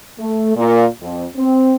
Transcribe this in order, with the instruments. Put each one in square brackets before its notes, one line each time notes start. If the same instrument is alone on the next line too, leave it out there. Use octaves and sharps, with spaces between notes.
[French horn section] A3
A#2
F2
C4